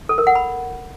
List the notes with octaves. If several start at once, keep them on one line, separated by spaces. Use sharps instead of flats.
A4
A#4
F#5
B5